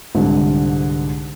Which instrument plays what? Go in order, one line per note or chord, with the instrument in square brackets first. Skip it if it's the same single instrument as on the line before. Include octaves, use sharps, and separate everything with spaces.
[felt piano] C2 G#2 D3